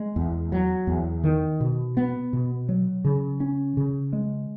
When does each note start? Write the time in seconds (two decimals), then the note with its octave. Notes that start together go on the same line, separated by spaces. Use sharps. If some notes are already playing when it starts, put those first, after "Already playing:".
Already playing: G#3
0.16 E2
0.52 F#3
0.87 E2
1.24 D#3
1.61 B2
1.97 B3
2.33 B2
2.69 F#3
3.05 C#3
3.40 C#4
3.77 C#3
4.13 G#3